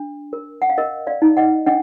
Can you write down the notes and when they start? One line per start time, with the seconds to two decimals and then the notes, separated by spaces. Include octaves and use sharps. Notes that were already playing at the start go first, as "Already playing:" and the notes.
Already playing: D4
0.33 A#4
0.62 F#5
0.70 F5
0.78 A#4 D#5
1.07 D5 F5
1.22 D#4
1.37 D#5 F#5
1.66 D4 D#5 F#5